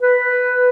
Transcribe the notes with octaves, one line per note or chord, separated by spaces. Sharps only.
B4